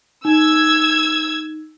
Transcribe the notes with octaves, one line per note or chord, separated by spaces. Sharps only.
D#4 E6 G#6